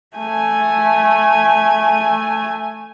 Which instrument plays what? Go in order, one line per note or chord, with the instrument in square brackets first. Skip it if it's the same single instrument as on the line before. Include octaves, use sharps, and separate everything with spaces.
[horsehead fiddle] A3 G#5